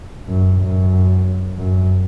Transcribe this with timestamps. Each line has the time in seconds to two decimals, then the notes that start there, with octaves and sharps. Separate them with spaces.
0.28 F#2
0.60 F#2
1.57 F#2